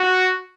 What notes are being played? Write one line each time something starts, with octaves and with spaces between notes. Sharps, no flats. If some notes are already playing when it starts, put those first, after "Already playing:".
Already playing: F#4